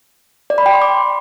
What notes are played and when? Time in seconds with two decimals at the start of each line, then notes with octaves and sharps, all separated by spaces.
0.50 D5
0.58 B5
0.66 G5
0.74 C6
0.82 D6